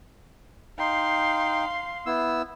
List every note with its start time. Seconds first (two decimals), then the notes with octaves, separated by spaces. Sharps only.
0.79 D#4 F5 G5 C6
2.06 B3 E4 E6